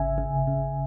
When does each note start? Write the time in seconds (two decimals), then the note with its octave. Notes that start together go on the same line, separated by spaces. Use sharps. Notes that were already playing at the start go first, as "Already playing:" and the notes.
Already playing: G#1 C#3 E5 G#5
0.18 C#3
0.47 C#3